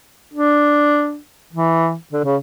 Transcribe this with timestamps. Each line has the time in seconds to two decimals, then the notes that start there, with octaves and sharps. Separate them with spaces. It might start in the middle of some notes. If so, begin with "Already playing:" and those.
0.34 D4
1.53 E3
2.13 D3
2.24 C#3